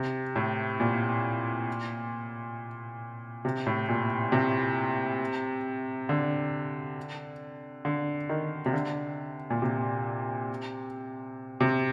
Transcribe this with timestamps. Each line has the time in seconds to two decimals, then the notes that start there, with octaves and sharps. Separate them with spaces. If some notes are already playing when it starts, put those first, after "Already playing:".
Already playing: C3
0.36 A2
0.80 A#2
3.45 C3
3.66 A2
3.89 A#2
4.32 C3
6.09 D3
7.85 D3
8.29 D#3
8.66 C3
8.73 D3
9.50 A#2
9.62 C3
11.61 C3